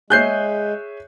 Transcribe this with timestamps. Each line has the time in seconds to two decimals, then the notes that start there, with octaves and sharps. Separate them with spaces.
0.10 G#3 G#4 C#5 E5 F#6 G6 C7